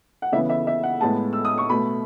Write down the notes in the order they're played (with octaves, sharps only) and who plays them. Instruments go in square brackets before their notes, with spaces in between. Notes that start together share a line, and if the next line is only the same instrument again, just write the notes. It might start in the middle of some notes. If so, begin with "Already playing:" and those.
[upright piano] F#5
C#3 E3 B3 E5
E5
E5
F#5
A2 G#3 B3 A5
E6
D#6
C#6
B2 A3 B5